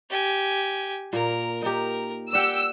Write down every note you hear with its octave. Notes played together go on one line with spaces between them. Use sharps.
G4 G#5
A#2 A#3 A#4
D#4 G4 A#4
G4 D5 F#5 G5 E6